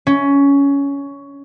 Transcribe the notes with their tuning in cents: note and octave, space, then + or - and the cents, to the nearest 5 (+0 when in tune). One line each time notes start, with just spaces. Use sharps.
C#4 +15